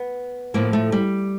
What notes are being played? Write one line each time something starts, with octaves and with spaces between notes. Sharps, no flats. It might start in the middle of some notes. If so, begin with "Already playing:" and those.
Already playing: B3
A2 F3 A#3
A3
G3